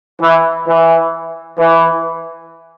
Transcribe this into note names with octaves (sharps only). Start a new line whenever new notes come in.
E3
E3
E3